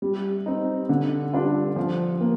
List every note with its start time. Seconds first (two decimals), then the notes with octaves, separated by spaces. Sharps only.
0.02 G3
0.46 C4 D#4
0.89 D3
1.33 G3 D4 F4
1.76 F3
2.21 A#3